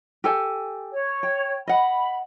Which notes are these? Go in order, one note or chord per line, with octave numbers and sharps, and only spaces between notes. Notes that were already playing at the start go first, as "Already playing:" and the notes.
G4 A4 G#5
C#5
G5
D#5 F#5 B5